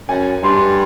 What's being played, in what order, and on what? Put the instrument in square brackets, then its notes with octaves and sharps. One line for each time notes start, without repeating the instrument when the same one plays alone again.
[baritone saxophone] F#2 [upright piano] G#5
[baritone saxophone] G2 [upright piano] C6